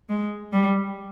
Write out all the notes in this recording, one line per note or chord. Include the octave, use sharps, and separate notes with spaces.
G#3
G3